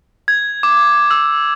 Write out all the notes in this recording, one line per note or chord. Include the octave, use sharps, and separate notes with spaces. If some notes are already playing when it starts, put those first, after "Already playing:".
G#6
D6
E6